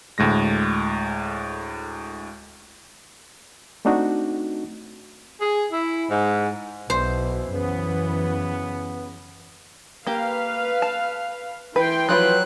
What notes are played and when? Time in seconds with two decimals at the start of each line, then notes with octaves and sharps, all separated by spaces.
0.18 D2 A2 G#3 A#6
3.85 A3 C4 D4 D#4 F#4
5.40 G#4
5.71 E4
6.09 G#2
6.90 B1 B2 E3 C5
7.52 F#2 C#3 E3 B3
10.07 A#3 G4 B4 F5
10.82 A5
11.76 E3 B4 G5 C6
12.09 F3 F#3 F4 B4 F#6